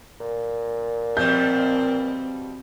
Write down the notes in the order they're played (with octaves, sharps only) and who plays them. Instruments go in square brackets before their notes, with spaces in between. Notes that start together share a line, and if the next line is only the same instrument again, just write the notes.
[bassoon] A#2
[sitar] B2 F3 G3 [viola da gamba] C4 [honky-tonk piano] G6